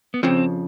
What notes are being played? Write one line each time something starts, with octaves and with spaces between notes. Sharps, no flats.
B3
F2 C#3 F3 C4